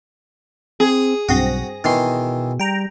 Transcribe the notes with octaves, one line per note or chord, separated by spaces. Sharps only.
C4 G#4
B1 G2 C4 F#4 D#6 A#6
B2 D#3 E3 C6
G3 G5 A#5